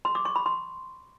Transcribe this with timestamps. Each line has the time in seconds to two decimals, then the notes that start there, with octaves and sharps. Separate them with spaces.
0.05 C6
0.15 D6
0.25 C#6
0.36 B5
0.46 C6